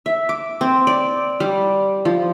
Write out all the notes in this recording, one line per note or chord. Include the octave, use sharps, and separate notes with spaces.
E5
D6
C4
D5
G3
F3